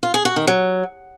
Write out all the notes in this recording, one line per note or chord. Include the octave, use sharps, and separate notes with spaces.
F4
G#4
F#4
D#3
F#3